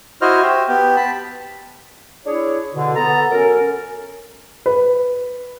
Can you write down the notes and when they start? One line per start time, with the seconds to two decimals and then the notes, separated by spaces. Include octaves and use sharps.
0.21 E4 F#4 C5 D#5 F6
0.43 G4 E5
0.68 B3 G4
0.96 A5 B5
2.26 D4 E4 G#4 C#5
2.74 B2 D3
2.96 B3 A4 A#5
3.31 F#3 C#4 A4 A#4
4.66 B4